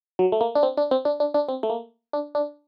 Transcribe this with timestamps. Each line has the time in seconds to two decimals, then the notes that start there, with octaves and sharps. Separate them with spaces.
0.19 F#3
0.32 A3
0.41 A#3
0.55 D4
0.63 C4
0.77 D4
0.91 C4
1.05 D4
1.20 D4
1.34 D4
1.49 C4
1.63 A3
1.70 A#3
2.13 D4
2.35 D4